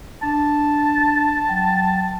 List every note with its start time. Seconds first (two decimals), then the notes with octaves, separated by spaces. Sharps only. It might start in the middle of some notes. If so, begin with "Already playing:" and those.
0.23 D4 A5
1.49 F#3 G5